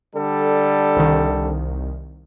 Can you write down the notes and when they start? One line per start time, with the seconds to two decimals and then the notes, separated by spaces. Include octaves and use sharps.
0.16 D3 G3 A4
0.96 C2 D#3